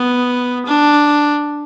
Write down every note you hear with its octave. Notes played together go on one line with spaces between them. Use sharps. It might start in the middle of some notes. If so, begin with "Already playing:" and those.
Already playing: B3
D4